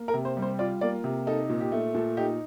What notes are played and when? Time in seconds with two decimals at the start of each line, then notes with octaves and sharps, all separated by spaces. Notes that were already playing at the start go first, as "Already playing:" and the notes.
Already playing: A#3
0.08 A#4
0.14 C3
0.25 C5
0.37 G3
0.42 C5
0.59 F4 D5
0.81 A#3 D5
1.04 C3
1.27 D#4 A4
1.49 A#2
1.60 G4
1.72 A3
1.94 A#2 A4
2.17 D#4 G4